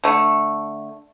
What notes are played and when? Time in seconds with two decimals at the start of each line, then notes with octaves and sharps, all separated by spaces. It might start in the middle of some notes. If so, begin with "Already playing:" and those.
0.04 D3 A3